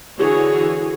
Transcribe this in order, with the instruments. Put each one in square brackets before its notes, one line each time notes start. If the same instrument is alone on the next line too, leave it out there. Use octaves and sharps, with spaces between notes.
[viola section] D3 E3 F#4 G#4 C#5